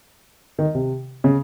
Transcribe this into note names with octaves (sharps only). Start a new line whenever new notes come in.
D#3
C3
C#3